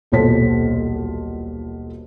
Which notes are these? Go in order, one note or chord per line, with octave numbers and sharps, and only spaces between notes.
D#1 B1 A#2 A4 C5 B6